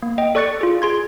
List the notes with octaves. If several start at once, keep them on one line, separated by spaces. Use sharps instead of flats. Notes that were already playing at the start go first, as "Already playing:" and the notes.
A#3
D#5 G5
A4 D5 C#6 F#6 A6 C#7
F4 G#4
G#4 C6 G#6